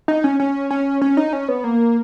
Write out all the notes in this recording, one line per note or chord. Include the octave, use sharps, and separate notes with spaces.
D#4
C#4
C#4
C#4
C#4
D#4
C#4
B3
A#3